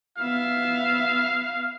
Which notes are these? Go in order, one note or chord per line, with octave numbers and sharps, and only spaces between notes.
B3 E5 F5